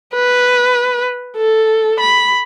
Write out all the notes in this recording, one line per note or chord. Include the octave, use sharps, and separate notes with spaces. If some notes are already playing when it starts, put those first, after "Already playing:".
B4
A4
B5